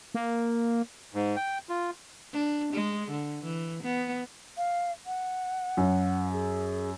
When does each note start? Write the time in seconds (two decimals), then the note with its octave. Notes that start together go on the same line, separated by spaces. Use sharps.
0.15 A#3
1.14 G#2
1.36 G5
1.69 F4
2.33 D4
2.73 G#3
3.11 D3
3.44 E3
3.83 B3
4.57 F5
5.06 F#5
5.77 F#2
6.32 G#4